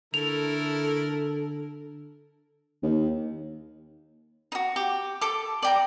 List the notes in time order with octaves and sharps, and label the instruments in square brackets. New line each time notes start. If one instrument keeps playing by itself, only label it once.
[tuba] D3 [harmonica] A3 E4 A#4 [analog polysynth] A4 [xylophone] F7
[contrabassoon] D#2
[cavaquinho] D#4 F#4
G4
A4 D6
D5 G5 A#5